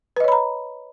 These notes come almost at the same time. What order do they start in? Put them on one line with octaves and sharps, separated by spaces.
B4 D#5 C#5 B5 A#5